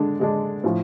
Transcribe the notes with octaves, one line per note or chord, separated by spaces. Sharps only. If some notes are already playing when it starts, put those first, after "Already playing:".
Already playing: D3 G#3 D4
D3 G#3 D4
A2 F3